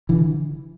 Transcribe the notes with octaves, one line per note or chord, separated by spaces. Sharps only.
D3 E3